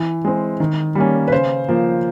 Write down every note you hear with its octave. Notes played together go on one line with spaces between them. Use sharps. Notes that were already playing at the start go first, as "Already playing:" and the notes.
Already playing: E3
G#3 C4
D#3
G3 A#3 C#4
B4
C#3 C5
F3 A#3